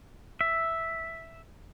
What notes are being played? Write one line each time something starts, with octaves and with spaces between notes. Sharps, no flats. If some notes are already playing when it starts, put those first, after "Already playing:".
E5